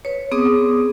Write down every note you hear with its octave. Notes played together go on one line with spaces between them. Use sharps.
B4 C#5
B3 C4 G#4 D6 D#6